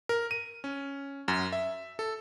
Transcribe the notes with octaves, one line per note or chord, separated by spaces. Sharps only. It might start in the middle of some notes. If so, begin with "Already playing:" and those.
A#4
D#7
C#4
F#2
E5
A4